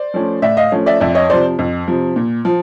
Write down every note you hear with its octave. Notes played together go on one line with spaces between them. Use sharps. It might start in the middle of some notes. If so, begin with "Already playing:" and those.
Already playing: C5 D5
F3 A3 C#4
A2 D5 E5
D#5 F5
F3 A3 C#4
D5 E5
F2 D5 E5
C#5 D#5
C3 F3 C5 D5
F2
C3 F3
A#2
F3